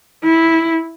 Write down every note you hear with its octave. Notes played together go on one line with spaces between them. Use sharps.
E4